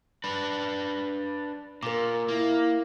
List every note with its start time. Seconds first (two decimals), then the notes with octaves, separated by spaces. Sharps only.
0.24 D4 B4
1.83 A#2 A#4 D6
2.28 A#3 E4